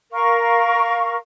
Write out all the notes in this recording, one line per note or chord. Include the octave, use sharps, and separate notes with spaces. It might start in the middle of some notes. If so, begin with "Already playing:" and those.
A#4 F5 C#6